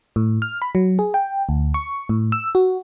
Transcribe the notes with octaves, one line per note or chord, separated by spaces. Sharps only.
A2
F6
B5
F#3
G#4
G5
D2
C#6
A2
E6
F#4